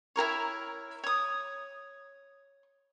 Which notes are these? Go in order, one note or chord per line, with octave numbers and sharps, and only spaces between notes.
E4 G#4 A#4 C#5
C#5 D#6